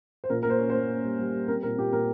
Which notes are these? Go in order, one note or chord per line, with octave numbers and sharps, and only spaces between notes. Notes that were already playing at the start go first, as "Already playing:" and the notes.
C5
A#2 A#4
A#3 A#4
C5
C#4
A#3 C5
C#4
G3
G3
G3
C4 A#4
A#2 A#4
A#2 G4
A#2 A#4